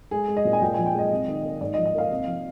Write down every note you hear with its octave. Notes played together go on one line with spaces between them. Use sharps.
G#3 G#4
G#3
D#5
A#2
G#5
A#2 G5
F3 G#5
G5
G#3 D#5
C3
D#3
A#3
G#2 D5
D#5
F3
D#5
A#3 F5
C3
F3